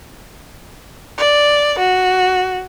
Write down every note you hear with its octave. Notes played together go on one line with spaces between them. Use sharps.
D5
F#4